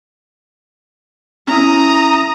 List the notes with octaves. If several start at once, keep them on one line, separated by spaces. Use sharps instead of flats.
C#4 E4 A#5 D#6